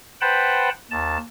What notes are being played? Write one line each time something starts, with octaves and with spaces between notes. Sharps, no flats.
B4 C5 F#5 G5 A5 B5
D#2 A5